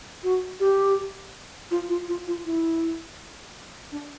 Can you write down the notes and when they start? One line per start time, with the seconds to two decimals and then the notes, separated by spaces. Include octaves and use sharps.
0.24 F#4
0.60 G4
1.71 F4
1.89 F4
2.08 F4
2.27 F4
2.45 E4
3.92 D4